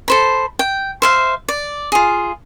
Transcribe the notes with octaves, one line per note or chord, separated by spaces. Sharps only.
A4 C5 B5
G5
C5 E5 F5
D5
F4 G#4